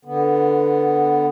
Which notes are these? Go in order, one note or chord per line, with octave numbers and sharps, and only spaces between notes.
D3 B3